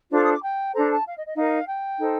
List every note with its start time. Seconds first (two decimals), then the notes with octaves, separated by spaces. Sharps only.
0.11 D4 F4 A4 C5 D6
0.22 D#6
0.32 D6
0.42 G5
0.73 D4 A4 C5 A#5
0.90 A5
1.05 F5
1.15 D#5
1.26 D#5
1.36 D#4 A#4 F5
1.67 G5
1.98 D#4 A4 C5